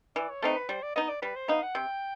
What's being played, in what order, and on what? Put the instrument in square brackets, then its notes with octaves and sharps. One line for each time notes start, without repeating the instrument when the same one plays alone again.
[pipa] E3 [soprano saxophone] D5
[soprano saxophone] C#5
[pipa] A3 C4 D#4 [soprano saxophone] B4
[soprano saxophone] B4
[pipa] G3 [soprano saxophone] C5
[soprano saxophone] D5
[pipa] B3 D#4 [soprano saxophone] D#5
[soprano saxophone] D5
[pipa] G3 [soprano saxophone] B4
[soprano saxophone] C5
[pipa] B3 D#4 [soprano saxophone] F5
[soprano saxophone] F#5
[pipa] C3 [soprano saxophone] G5